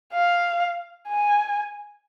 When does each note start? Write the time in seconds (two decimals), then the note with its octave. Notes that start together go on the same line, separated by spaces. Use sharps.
0.13 F5
1.08 G#5